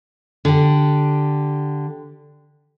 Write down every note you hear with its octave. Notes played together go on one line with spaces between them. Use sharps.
D3 G4